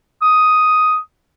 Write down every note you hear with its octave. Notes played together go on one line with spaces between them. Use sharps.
D#6